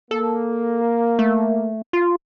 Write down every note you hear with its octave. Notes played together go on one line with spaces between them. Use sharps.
A#3 A4
A3
F4